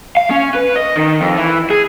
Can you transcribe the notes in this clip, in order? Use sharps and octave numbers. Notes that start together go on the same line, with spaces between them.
F5
C#4
B4
D#5
D#3
F2
E3
G#4